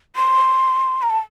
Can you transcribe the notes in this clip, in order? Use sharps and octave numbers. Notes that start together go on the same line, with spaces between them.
C6
A#5
A5